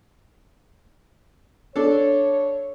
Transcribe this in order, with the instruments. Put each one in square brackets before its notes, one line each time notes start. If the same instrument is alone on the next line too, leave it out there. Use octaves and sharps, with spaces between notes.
[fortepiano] D4 A4 [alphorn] C#5